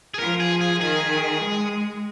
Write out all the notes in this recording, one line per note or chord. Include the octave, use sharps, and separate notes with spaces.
G#4
F3 A#4
G#4
G#4
D#3 G#4
G#3